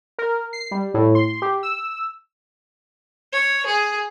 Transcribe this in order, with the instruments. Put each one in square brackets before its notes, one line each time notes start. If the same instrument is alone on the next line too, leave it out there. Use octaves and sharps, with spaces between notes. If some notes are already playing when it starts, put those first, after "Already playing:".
[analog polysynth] A#4
C7
G3
A2
C6
G4
E6
[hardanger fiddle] C#5
G#4